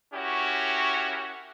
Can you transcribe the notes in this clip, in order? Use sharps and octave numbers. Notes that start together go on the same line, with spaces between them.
C#4 E4 F#4 G4 A#4 C#5